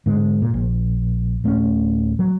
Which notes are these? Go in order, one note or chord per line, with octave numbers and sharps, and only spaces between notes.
G#2 D3 G#3
A#2
A#1
D1 A3 B3 C#4
F#3